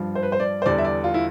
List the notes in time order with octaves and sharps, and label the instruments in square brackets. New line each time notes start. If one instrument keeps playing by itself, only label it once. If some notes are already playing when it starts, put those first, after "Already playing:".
Already playing: [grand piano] G2 F3
C5
B4
C5
D5
C5
E2 D3 G3 D5
E5
D5
F4
E4